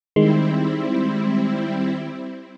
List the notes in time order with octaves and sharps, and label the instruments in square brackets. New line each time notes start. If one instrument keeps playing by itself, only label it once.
[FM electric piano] D#3 G#3 C6 [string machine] G3 C4 E4